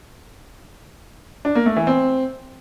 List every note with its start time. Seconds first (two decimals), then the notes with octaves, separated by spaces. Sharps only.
1.45 D4
1.55 A#3
1.66 A3
1.76 E3
1.87 C4